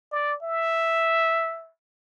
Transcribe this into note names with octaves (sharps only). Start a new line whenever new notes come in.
D5
E5